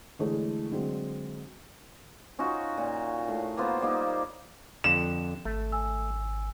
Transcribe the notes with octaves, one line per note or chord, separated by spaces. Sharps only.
D3 E3 G#3 A3 A4 C#5
D3 F#3 G#3 C4
C#4 D#4 F4 F#4
A#2
A2
A#3 B3 F4 C5
G3 A#3 D#4
F2 D3 E7
G#1 A3
G#5 E6